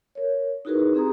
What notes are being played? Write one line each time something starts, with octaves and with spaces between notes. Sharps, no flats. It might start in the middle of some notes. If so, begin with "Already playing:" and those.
A#4 C#5
D#4 E4 F#4 G#4 A#4 B4
C4 G4 G#4 A#5 D#6